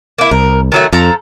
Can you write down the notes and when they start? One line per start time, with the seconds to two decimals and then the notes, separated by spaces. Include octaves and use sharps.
0.18 A#3 E4
0.31 C2 A#4
0.72 D#3 F#3 A3
0.93 F2 F3 A4 A#5